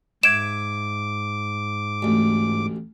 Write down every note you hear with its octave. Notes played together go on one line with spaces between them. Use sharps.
G#2 E5 D6 G#6 D7 E7
A1 D2